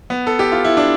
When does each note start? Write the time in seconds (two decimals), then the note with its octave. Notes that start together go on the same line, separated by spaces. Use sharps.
0.10 B3
0.27 A4
0.39 G4
0.52 F4
0.65 E4
0.77 D4